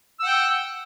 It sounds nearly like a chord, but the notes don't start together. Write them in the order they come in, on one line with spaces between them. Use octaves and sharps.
E6 F#5 G5